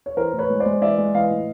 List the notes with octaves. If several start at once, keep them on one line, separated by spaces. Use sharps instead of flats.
C#5
E3 A#4 C5
A2
B4 C#5
G#3
C5 D5
G#3
E3 D5 E5
G#3
E3 D#5 F5
A2